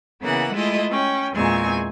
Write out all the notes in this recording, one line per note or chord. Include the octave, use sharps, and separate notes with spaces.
C#3 E3 A#3 B3 F#5
G#3 A3 E4 F4 D#5
C#4 G5
E2 A#2 G#3 C4 G#5 C#6